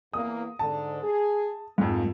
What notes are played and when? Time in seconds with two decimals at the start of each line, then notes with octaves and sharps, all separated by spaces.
0.13 E2 A#3 D#6
0.59 G#2 D3 A5
1.03 G#4
1.78 F2 G#2 A#3